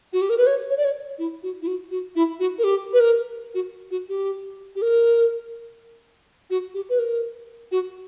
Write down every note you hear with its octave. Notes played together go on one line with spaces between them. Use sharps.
F#4
G4
A#4
B4
C#5
C#5
D5
C#5
E4
F#4
E4
F#4
F#4
E4
F#4
A#4
G4
B4
A#4
F#4
F#4
G4
G4
A#4
F#4
G4
B4
A#4
F#4